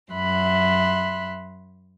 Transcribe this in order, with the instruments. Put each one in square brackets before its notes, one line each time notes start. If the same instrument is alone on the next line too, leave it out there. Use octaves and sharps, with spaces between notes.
[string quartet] F#2 E5 B5 C6 F#6